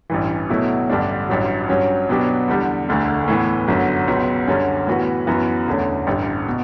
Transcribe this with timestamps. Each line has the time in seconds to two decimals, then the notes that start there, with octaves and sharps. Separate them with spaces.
0.10 A1 G2 E3
0.49 B2 F#3 A3 E4
0.89 A1 G2 D3 G3 D4
1.29 A1 G2 F#3
1.69 G2 F#3 C#4
2.09 B2 F#3 B3 D4 G4
2.48 E2 D3 G3
2.88 E1 D2 D3 A3
3.28 A2 E3 B3
3.68 G1 F#2 D3 F#3
4.08 C#2 B2 F#3 B3
4.47 F#2 D3 G3 C#4
4.87 A2 E3 B3 F#4 B4
5.27 F#2 E3 B3 F#4
5.67 E1 E2 D3 A3 C#4
6.07 A1 G2 D3
6.48 B2